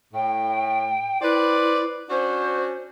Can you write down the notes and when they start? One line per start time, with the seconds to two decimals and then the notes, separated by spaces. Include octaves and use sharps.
0.13 A2 G5
1.22 E4 B4 C5 D5
2.10 C#4 D4 F#4 C5